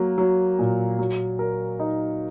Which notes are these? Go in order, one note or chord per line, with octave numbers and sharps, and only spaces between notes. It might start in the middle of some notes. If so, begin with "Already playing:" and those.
Already playing: F#3 A#3
F#3
A#2
F#3
A#4
D#4